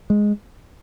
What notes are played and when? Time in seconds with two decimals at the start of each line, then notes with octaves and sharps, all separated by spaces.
0.10 G#3